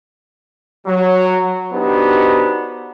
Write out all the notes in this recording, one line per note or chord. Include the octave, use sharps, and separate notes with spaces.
F#3
B3 D4 D#4 F#4 G4 C5